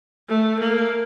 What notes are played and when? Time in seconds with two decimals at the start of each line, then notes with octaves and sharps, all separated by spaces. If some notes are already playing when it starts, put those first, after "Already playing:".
0.29 A3
0.59 A#3